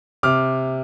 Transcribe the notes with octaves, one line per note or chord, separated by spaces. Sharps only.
C3 D6 F6